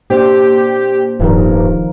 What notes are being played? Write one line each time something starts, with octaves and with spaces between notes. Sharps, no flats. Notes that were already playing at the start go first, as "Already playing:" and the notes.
A#2 D4 G4 C5
D1 G2 D#3 F3 A#4